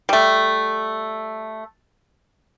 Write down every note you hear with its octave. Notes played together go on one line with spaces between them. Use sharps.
G3 A3